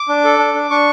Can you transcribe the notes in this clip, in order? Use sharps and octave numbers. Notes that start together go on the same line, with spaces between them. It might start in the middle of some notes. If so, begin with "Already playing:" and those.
Already playing: D6
D4
A4
D4
D4
D4 C#6